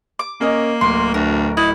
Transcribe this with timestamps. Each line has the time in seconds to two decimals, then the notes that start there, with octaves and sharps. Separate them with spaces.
0.19 D6
0.41 A#3 C#4 A#4 D#5
0.81 D1 C6
1.14 D2 A#4
1.57 D#4 E4